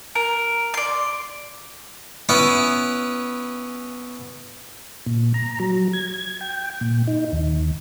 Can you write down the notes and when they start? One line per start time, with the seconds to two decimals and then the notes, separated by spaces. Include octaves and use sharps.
0.15 A#4
0.74 D5 C6
2.29 B3 C#4 E4
5.06 A#2
5.34 A#5
5.60 F#3
5.93 G#6
6.14 G#6
6.41 G5
6.81 A#2
7.07 D#4
7.32 D#2